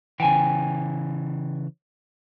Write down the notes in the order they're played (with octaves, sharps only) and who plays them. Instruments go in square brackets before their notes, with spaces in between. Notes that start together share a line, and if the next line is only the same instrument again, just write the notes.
[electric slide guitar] C#3 E3 [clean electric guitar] G5 G#5